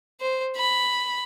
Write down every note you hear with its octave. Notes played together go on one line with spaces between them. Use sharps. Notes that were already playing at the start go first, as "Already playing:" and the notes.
C5
B5